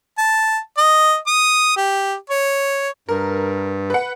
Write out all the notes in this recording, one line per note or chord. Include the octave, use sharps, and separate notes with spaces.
A5
D#5
D#6
G4
C#5
G2 A#4
B4 F#5